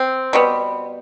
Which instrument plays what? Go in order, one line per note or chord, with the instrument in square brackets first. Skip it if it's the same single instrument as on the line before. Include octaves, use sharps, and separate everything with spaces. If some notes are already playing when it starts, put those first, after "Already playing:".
Already playing: [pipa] C4
B2 G3 B3